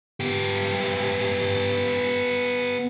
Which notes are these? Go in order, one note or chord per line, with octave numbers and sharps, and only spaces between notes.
B3 G4